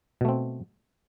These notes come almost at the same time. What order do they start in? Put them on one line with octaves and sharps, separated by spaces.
B2 A3 C4